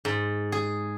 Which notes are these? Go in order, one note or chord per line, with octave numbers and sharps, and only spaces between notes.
G#2
G#4